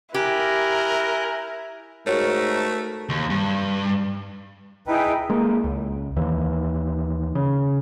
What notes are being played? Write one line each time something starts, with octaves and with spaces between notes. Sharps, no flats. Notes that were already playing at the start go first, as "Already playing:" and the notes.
E4 G4 A#4 G#5 F#6 G6
G#2 A3 F#4 A#4 C#5
D#2
G2
D#4 E4 G#4 B4 E5 G5
G#3 A#3
C#2
D#2 E3
C#3